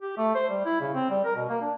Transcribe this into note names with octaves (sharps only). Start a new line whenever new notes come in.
G4
A3
C5
G3
E4
C#3
C4
G3
A#4
B2
A#3
D4